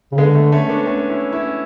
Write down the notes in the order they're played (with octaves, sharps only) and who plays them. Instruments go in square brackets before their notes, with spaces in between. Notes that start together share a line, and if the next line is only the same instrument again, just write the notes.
[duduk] C#3
[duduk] D3 [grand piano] G#3 B3
[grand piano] A3
A3 C#4
B3 D4
A3 C#4
C#4 E4
C#4 E4